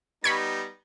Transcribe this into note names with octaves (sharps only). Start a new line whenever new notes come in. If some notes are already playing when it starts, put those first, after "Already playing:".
G3 B3 D#4 B5 C#6 G#6